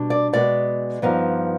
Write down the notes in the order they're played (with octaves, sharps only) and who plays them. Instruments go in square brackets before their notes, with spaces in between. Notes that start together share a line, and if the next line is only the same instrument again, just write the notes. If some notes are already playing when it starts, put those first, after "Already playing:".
Already playing: [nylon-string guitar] B2 G3 D4
D5
B2 G#3 B3 D5
G2 F3 B3 D#4